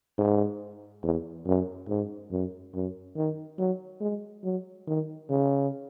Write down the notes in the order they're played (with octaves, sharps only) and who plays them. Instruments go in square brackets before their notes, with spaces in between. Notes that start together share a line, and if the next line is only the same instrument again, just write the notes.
[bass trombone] G#2
E2
F#2
G#2
F#2
F#2
D#3
F#3
G#3
F#3
D#3
C#3